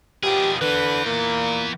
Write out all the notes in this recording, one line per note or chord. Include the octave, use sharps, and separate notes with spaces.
B2 D#3 F3 D4 G4 G#4
D3 E3 B3 B4
A#2 A#3